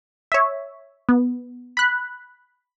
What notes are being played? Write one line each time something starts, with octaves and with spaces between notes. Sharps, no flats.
C#5 E5
B3
B5 F#6